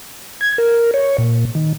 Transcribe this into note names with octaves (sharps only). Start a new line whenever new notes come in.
G#6
A#4
C#5
A#2
D#3